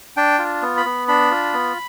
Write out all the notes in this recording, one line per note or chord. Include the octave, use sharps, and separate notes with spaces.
D4 G5
F4
B3
B5
B3
D4 B5
F4
B3